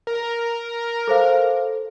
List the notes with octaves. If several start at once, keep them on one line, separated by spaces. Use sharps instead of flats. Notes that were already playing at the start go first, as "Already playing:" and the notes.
A#4
A4 C5 F5